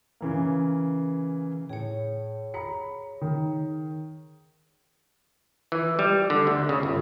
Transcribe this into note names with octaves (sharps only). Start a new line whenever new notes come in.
C#3 E3 A#3
A2 G#4 C#5
A#5 B5 C#7
D#3
E3
G3
D3
D2
C#3
G1